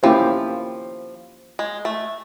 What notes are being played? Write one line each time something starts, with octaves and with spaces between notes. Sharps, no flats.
F3 A#3 C#4 E4 G4 C5
G#3
A3